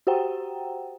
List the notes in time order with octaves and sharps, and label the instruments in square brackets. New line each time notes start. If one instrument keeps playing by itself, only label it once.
[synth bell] F#4 G4 C5 F#5 G5 A#5